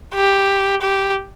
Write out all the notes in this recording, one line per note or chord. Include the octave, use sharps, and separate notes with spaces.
G4
G4